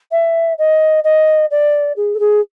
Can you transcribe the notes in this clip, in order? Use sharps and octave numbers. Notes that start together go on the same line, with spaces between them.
E5
D#5
D#5
D5
G#4
A4
G#4